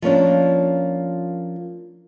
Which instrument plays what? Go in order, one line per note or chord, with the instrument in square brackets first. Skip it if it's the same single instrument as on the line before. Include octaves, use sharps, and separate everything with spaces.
[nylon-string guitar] F3 A#3 C#4 D4